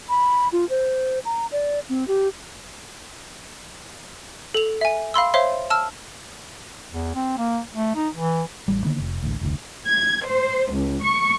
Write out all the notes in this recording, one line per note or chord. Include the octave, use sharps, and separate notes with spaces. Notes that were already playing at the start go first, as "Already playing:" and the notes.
B5
F4
C5
A#5
D5
C4
G4
A4 F7
E5 G#5
F5 B5 C6 E6
C5 C#5 E5 F5 C6
A5 E6 F6
E2
C4
A#3
A3
D#4
E3
A1 G3
D3 D#3 A#3 B3
F1
A1 D2
F1 D2
G#6
C5
C#2
C#6